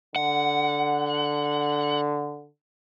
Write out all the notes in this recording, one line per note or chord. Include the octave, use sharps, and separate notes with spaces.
D3 F#5